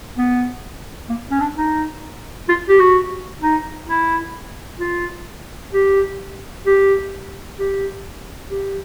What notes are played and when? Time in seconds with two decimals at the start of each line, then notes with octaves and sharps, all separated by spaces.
0.17 B3
1.09 A#3
1.31 C#4
1.41 D4
1.57 D#4
2.49 F4
2.69 G4
2.79 F#4
3.42 D#4
3.88 E4
4.80 F4
5.73 G4
6.66 G4
7.59 G4
8.51 G4